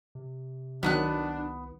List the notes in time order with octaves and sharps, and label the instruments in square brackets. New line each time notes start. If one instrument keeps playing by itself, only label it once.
[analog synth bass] C3
[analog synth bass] C2 [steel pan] D#3 F#3 [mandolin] B3 A#5 F#6 [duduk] D4